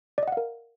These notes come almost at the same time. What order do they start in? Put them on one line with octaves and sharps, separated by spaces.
D5 D#5 F#5 F5 A#4